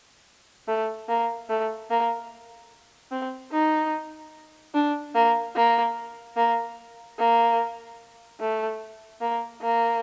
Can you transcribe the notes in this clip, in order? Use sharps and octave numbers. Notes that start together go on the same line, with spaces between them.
A3
A#3
A3
A#3
C4
D#4
D4
A#3
A#3
A#3
A#3
A3
A#3
A#3